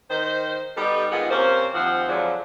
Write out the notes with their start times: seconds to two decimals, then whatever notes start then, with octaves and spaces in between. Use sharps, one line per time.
0.10 D#3 C5
0.77 G3 B3 D#4 G4 A4
1.12 G#2 D#3 B3 F4 G#4
1.30 C3 A#3 C#4 C5
1.74 D#2 F3 C4 F#5
2.09 F2 D3 F3 F#3 G#3